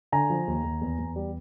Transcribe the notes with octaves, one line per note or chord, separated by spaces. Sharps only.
D3 G#5 A#5
F3
D#2
D#2
E2
E2
G3